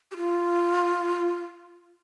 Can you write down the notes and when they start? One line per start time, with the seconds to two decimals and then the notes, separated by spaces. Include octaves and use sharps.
0.11 G4
0.17 F4